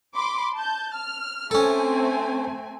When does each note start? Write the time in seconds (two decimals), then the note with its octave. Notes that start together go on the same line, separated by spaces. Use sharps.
0.16 B5 C6 D6
0.54 A5 G6
0.94 F6
1.51 A3 C4 C#4 A4 G#5